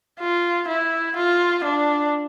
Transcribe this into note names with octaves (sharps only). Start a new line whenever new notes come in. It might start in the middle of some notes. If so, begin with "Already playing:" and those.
F4
E4
F4
D4